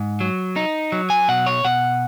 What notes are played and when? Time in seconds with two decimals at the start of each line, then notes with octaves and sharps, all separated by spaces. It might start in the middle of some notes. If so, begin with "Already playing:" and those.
Already playing: G#2
0.20 F#3
0.56 D#4
0.92 F#3
1.10 G#5
1.28 B2 F#5
1.46 C#5
1.64 B2 F#5